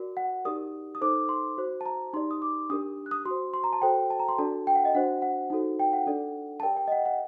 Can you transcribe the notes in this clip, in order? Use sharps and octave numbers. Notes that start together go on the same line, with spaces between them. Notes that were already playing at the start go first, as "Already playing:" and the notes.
Already playing: F#4 A#4 D5
F#5
D#4 G4 A#4 D5 D#6
D#6
D#4 A4 C5 D6
C6
F#4 C5
A5
A#5
D#4 G4 D5 C6
D#6
D6
D4 G4 A#4 D#6
F#6
D#6
F#4 C6
C5
C6
A#5
A5
F#4 A4 C5 G5
A5
A#5
C6
D4 F#4 A4 D5 A5
G5
F#5
D#5
D4 F#4 C5 F#5
F#5
D#4 F#4 A4 C5
G5
F#5
D4 A4 D5
A5
G4 A#4 D5 G5
G5
D#5
F#5
F#5